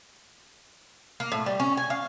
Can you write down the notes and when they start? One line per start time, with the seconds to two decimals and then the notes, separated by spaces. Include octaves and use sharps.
1.20 A#3
1.32 A2
1.46 G3
1.60 C#4
1.77 G#5
1.90 F5